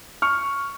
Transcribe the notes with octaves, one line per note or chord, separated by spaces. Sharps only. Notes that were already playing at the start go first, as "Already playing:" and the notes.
C#6 F6